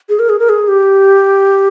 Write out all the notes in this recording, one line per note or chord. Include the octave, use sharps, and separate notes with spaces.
G#4
A#4
G#4
A#4
G#4
G4